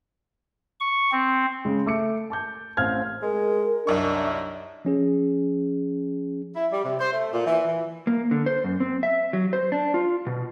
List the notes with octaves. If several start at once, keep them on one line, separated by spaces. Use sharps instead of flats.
C#6
C4
C#3 G#3
A3 D6 C#7
A5 D6 G6
A1 C4 F5 F6 G#6
G#3 A#4
C2 F#2 D4 D#4 C#6
F3 C#4 G#4
E4
G3
C3
C5
A3
A#2
E3
E3
A#3
D3
C5
F#2
C4
E5
F#3
C5
D4
F4
B2